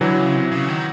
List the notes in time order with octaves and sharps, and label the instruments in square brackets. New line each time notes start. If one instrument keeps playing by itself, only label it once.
[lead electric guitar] D3 [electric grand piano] E3 F#3
[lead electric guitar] C#3
C3
C#3
D#3